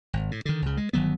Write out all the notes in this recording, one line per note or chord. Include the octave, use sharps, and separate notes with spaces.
G#1
A2
D3 D#3
C#2 C#3
G#3
G1 D#3 F#3 B3